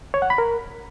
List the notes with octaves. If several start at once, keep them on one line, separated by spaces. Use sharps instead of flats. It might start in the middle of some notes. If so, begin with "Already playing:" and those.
C#5
F#5
B5
A#4